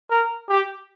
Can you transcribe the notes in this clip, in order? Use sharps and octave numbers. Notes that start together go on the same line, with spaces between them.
A#4
G4